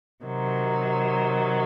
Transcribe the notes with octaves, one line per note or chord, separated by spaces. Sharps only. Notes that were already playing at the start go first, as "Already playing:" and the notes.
C3 D#3 F#3